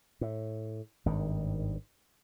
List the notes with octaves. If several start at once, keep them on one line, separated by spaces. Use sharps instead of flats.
A2
G#1 G2 D#3